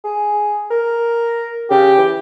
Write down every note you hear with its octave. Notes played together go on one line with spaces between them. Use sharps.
G#4
A#4
C#3 G4
E3